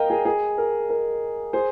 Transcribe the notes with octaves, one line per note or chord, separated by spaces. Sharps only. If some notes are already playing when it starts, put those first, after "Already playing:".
Already playing: A#4 D#5 F5 G5 A#5
G#4
G#4
A#4
A#4
G#4 C5